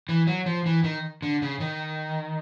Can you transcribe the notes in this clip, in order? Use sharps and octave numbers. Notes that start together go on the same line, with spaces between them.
E3
F#3
F3
E3
D#3
D3
C#3
D#3